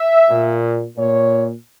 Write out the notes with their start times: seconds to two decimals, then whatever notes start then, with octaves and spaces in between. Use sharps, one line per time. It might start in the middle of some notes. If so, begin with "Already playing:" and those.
Already playing: E5
0.30 A#2
0.98 A#2 C#5